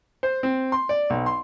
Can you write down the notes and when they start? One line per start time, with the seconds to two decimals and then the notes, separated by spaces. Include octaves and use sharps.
0.23 C5
0.43 C4
0.72 C6
0.89 D5
1.10 B1
1.26 C6